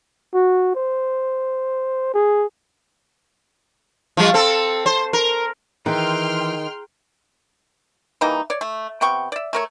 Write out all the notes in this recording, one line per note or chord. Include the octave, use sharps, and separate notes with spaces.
F#4
C5
G#4
F3 G3
C4 A4
C5
A#4
D#3 E3 G#4 G5 A#5 C6 F6 F#6
E3 G3 A#3 D#4
C#5 D5
A3
C3 B3 G5 C#6
D5 E5
A3 A#4 C#5